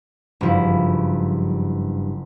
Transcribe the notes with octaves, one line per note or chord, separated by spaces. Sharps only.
F#1 G2 F3 E4